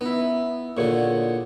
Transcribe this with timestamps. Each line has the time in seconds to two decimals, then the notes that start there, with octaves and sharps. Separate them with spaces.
0.01 B3 D#4 E4
0.77 A#2 D3 G#4 C#5 F#5